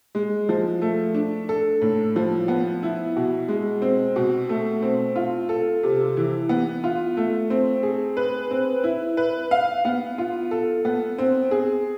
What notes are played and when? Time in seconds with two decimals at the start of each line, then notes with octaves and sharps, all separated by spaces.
0.15 G#3
0.49 F3
0.82 A3
1.14 D4
1.49 A4
1.81 A2
2.16 F3
2.48 B3
2.83 E4
3.16 B2
3.48 G#3
3.82 C4
4.16 B2
4.49 A3
4.82 C4
5.16 F4
5.49 A4
5.83 C3
6.17 E3
6.49 B3
6.84 F4
7.17 A3
7.50 C4
7.83 G#4
8.17 B4
8.51 C4
8.84 E4
9.17 B4
9.51 F5
9.85 B3
10.18 F4
10.51 A4
10.85 B3
11.19 C4
11.51 G#4